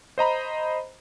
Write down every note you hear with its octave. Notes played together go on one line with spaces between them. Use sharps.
C5 D#5 A#5 B5